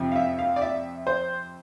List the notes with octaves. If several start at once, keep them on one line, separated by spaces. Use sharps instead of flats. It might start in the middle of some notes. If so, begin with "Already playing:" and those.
Already playing: F2 C3 F3
F5
E5
F5
D5
E5
C5